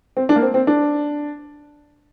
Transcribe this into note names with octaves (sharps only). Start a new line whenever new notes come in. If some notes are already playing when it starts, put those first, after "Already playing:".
C4
D4
A#3
C4
C4
D4